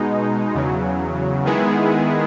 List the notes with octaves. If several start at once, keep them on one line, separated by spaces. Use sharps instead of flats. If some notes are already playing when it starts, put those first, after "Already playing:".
Already playing: B2 G#3 D#4
E2 C#3 F#3
D#3 G#3 B3 E4 G#4